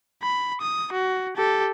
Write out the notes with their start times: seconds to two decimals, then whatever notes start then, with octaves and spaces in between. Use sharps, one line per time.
0.23 B5
0.61 D#6
0.93 F#4
1.37 G4 A4